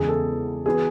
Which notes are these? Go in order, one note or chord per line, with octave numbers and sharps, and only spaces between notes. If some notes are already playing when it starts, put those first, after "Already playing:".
Already playing: E2 C#3 G#3 B3 G#4
A4
E3 B3 F#4 G#4 B4